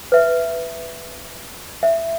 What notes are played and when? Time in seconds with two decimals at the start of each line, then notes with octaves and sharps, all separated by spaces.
0.12 B4 E5
1.83 E5